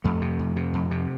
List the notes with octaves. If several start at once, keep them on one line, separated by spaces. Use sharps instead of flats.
F2 A3
C3
F2
C3
F2
C3